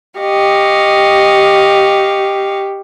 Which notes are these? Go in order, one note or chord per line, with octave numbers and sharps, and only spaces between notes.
G4 D#5 F5 C#6